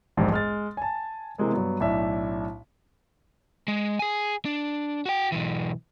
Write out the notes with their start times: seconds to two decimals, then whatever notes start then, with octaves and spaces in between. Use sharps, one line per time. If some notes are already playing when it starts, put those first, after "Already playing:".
0.17 E1 A#1 G#2 G4
0.32 G#3 F6 A6
0.77 G#5 A5
1.38 C3 E3 G#3 A#3
1.52 G2 F#3 B3
1.80 B1 A2 D4 E5
3.68 G#3
3.99 G#4 G#5
4.45 D4
5.06 F#4 G5
5.32 B1 E3